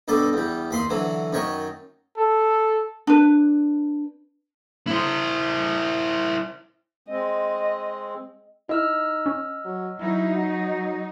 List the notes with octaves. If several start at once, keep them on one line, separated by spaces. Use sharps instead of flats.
G2 B2 A4 D5
E2 G3
D#2 B5 C6 D#6
D3 E3 F#3
F#2 D#3 C#5 D#5 C#6
A4
D4 B4
E4 C5
G#3 C4 D#5
D#4 E4 D#5 E6 F6
C#4
F#3
F#3 D#4 E4
F#4